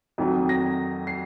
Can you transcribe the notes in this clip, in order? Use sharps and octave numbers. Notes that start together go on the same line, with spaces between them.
F2 D#3 F#3
A#6
C7